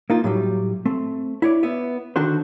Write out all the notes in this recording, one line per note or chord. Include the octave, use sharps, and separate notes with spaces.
A#3 D#4 F4
A2 F#3 G3
A3 C4
E4 C#5 D5
B3 E5
D3 D#3 D4 F#4 C5